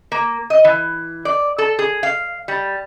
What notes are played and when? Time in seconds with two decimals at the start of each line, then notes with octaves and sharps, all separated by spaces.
0.12 A#3
0.50 D#5
0.65 E3
1.25 D5
1.58 A4
1.79 G#4
2.03 F5
2.48 G3